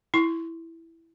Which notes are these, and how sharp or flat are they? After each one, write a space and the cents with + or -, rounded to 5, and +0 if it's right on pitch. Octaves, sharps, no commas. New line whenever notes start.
E4 +0 C#6 +0